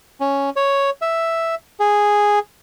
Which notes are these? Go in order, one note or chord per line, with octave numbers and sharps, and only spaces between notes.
C#4
C#5
E5
G#4